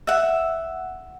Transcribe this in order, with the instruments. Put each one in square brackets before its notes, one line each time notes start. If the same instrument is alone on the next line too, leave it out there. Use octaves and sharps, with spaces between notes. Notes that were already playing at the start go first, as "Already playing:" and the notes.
[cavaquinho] E5 F#5